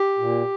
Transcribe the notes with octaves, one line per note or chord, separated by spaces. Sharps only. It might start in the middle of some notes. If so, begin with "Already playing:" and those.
Already playing: G4
A#2